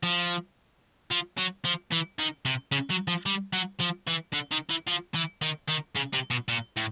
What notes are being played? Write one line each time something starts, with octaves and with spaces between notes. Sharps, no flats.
F3
F3
F#3
F3
E3
D#3
C3
C#3
F#3
F3
G3
F#3
F3
E3
D3
D#3
E3
F3
E3
D#3
D#3
C#3
C3
B2
A#2
A2